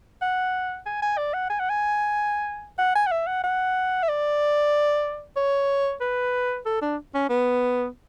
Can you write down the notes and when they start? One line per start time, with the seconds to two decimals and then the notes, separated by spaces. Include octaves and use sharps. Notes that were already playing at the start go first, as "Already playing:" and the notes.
0.22 F#5
0.86 G#5
1.02 G#5
1.18 D5
1.34 F#5
1.50 G#5
1.60 F#5
1.70 G#5
2.79 F#5
2.95 G#5
3.07 F#5
3.11 E5
3.27 F#5
3.44 F#5
4.03 E5
4.09 D5
5.37 C#5
6.01 B4
6.66 A4
6.82 D4
7.14 C#4
7.29 B3